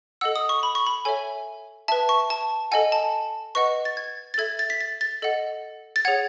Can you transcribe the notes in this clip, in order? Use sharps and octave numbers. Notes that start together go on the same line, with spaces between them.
A4 D#5 F#5 E6
D#6
C#6
B5
C#6
B5
A4 C#5 E5 G#5
B4 E5 A5
C#6
A5
A4 D#5 F#5 G#5
A5
B4 D#5 F#5 C#6
A6
G#6
A6
A4 E5 G#6
A6
B6
A6
A6
A4 D#5 F#5
A6
G#4 C#5 F#5 G#6